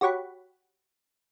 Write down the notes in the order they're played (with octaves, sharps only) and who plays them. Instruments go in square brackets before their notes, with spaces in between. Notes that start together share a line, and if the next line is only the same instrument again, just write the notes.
[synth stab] F#4 G4 C#5 F#5 B5